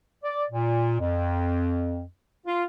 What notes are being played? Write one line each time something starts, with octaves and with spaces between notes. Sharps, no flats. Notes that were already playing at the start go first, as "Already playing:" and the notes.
D5
A#2
F2
F4